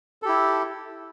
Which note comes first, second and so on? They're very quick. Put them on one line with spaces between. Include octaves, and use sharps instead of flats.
A4 G4 E4